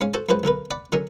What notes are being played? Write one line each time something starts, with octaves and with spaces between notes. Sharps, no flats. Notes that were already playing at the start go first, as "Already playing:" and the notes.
G#2 C#4 F5
F#4 A4 C5 A5
F#2 F3 G#3 B4 C5 F#5
B1 D3 A#4 B4
D5 F#5 B5
D3 F#3 C#4 D#4 A#4